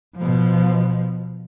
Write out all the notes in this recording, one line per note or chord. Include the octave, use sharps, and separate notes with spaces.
B2 F3